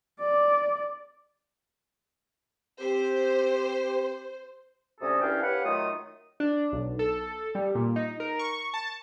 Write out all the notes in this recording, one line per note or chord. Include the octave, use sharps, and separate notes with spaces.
D5
C4 G4 C5
D2 C3 C#4 F#4 A4 D#6
C2 E3 C#4 D4 F5 G5
G4 B4 C#5 F5 F#5
D#3 F#3 A3 F4 D#6
D4
B1
A4
G3
A#2
D#4
A#4
C#6
A5